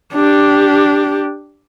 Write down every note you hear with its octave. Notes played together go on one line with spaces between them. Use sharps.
D4 G4